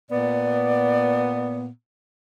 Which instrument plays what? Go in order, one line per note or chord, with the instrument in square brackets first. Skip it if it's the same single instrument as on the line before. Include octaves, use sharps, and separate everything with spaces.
[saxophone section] A#2 B3 [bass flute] D5